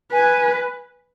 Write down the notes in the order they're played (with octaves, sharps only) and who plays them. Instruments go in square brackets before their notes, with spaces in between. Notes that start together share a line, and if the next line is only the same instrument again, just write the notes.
[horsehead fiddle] B4 [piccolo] G#5